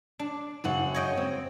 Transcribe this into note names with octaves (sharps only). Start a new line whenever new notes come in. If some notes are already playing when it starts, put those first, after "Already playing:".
D4
F#2 C#3 F#5
C#5 D#5 G5
C4